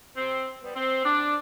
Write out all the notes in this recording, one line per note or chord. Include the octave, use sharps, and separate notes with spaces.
C3 C4
G3 B3
C4
C3 D4